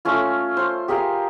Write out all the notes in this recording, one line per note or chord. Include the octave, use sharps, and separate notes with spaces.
A3 C#4 F4
C5
G4 G#4 A#4 F5